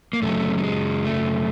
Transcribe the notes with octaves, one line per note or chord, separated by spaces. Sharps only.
A#3
F#2 C#3 F#3 A3
A3
G#3
A3